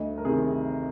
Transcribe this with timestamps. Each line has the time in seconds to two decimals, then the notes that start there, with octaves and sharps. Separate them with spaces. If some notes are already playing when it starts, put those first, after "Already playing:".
Already playing: D2 D#5
0.18 A#4
0.25 C3 D#3 G#4